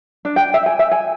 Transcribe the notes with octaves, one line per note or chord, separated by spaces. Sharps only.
D4
G5
E5
G#5
E5
G#5